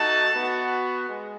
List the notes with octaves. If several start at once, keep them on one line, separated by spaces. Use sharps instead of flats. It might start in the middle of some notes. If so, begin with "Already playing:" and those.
Already playing: A3 D#4 F#4 A5
B3 F#4
G#3